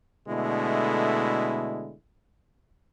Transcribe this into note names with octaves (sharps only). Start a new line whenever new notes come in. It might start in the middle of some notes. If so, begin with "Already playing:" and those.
B2 D3 G#3 A3 E4